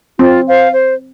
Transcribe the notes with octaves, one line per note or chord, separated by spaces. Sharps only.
C4 F4
C5 F5
C5